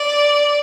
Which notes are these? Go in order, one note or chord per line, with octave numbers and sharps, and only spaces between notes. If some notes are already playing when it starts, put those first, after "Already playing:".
Already playing: D5